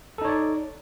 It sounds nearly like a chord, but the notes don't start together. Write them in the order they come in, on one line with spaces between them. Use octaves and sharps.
A4 D#4 C#5 D5